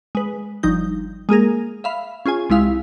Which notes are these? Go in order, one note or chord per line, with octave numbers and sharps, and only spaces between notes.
G#3 B4
G1 F3 D#4 G6
G#3 A#3 G#4 A#4
E5 F5 B5
C#4 F4 G#4 G#5
C2 G#3 E4 F5